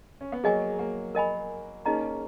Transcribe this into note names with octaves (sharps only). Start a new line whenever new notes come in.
C#4
B3
F#3 A#3 G#4 D#5 G#5 C#6
F#3 A#3
A#4 D#5 G#5 B5
A#3 C#4 D#4 G#4 D#5 A#5